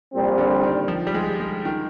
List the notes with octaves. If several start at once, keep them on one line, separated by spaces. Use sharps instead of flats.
A#1 A#2 G3 C4
D3
D#3
F3
G3
G#3
G#3
D#3